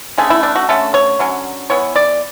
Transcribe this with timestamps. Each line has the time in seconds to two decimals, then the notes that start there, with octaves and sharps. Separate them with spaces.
0.18 D3 A3 C#4 G#4
0.30 E4
0.43 D4
0.56 F#4
0.69 D3 A3 C#4 A4
0.94 C#5
1.19 D3 F#3 C#4
1.70 E3 B3 C#5
1.96 D5